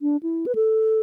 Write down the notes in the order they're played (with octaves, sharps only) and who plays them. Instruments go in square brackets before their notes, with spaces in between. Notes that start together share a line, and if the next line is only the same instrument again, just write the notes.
[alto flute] D4
E4
B4
A4